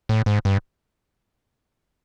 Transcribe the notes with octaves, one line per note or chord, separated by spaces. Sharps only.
A2
G#2
G2